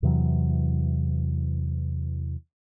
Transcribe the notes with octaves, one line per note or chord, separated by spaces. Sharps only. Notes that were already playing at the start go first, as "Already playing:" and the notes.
E2 C3 E3 F#3